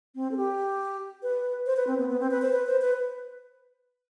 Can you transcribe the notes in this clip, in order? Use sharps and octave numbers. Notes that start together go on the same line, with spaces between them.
C4
A4
G4
B4
C5
B4
C4
B3
B3
C4
B4
C5
B4
C5
B4